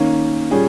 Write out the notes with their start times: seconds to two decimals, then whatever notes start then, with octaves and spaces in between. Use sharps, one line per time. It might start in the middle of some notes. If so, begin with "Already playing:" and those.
Already playing: D#3 A#3 C#4
0.51 A#2 G3 C#4 G#4